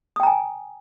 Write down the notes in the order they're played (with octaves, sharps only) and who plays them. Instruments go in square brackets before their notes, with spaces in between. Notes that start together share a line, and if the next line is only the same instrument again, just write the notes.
[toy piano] D#6
G5
A#5
G#5